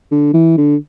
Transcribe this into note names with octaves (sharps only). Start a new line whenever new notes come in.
D3
E3
D3